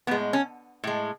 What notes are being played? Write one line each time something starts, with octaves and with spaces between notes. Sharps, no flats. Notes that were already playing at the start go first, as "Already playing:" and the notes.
A2 G#3 B3
C#4
A2 G#3